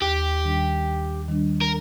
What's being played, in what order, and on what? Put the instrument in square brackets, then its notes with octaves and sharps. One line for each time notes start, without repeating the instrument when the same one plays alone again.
[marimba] D#2 [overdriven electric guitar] G4
[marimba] D#3 G3 D4
D#2
D#3 G3 D4
[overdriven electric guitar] A#4